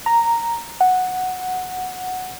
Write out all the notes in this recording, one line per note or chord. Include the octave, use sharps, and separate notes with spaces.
A#5
F#5